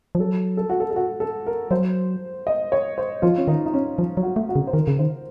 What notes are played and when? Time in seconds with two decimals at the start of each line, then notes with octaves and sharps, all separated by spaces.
0.15 F3
0.19 F#3 A4
0.57 A4
0.69 F#4
0.80 A4
0.91 A4
0.96 F#4
1.20 A4
1.47 A#4
1.71 F#3 C5
2.47 D#5
2.72 C#5
2.98 C5
3.22 F3 F4
3.38 C#4
3.47 D#3 D#4
3.66 D#4
3.74 C#4
3.98 F3
4.17 F#3
4.23 F#4
4.36 A3
4.49 F#4
4.56 C#3
4.67 C5
4.74 D#3 A#4
4.87 C#3
4.99 D#3 C5